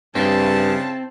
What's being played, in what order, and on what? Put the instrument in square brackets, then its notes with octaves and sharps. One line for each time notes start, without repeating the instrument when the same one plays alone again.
[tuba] G2 [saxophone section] C#3 [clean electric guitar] C4 [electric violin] E4 A5